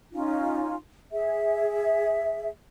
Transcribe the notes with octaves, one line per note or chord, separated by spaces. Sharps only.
C#4 D#4 F4
G#4 E5